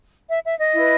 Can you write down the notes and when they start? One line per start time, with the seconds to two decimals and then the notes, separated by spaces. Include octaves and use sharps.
0.29 E5
0.44 E5
0.59 D#5
0.73 E4 B4